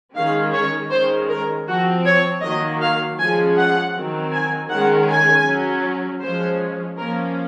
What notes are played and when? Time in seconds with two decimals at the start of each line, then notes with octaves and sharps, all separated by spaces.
0.15 D#3 G#3 C#4 F5
0.53 C#5
0.90 D#3 G#3 C#4 C5
1.28 A#4
1.67 F3 C4 F#4
2.05 C#5
2.42 D#3 F#3 A#3 D#5
2.81 F5
3.18 F3 G#3 C#4 G#5
3.56 F#5
3.95 D#3 F#3 C4
4.32 G#5
4.69 D#3 G#3 C#4 F#5
5.08 G#5
5.45 F#3 C#4
6.21 F3 G#3 C#4 C5
6.97 F3 A#3 C#4 A#4